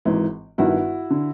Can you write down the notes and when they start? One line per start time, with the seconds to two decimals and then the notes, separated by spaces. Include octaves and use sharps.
0.05 G#1 G#2 E3
0.58 G1 G2 D#3 E4 F#4
1.10 D3